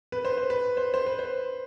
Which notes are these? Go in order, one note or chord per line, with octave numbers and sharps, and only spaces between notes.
B4
C5
C5
B4
C5
C5
B4
C5